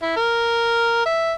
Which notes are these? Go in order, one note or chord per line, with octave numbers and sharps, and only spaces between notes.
E4
A#4
E5